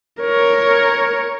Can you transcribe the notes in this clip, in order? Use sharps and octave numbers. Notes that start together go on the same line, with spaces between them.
A#4 C#5